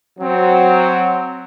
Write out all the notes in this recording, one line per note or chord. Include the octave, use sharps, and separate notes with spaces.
F#3 C4